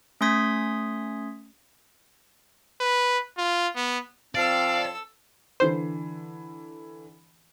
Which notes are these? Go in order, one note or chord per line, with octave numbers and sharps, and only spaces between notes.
A3 C#4 C6 D#6 G#6 B6
B4
F4
B3
F3 C4 A4 D5 F5 E6
D3 E3 C5 C7